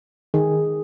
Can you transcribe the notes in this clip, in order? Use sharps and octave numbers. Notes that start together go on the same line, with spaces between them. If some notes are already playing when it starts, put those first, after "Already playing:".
D#3 G#4